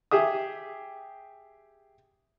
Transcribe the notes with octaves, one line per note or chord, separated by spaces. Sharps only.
G4 G#4 E5 D#6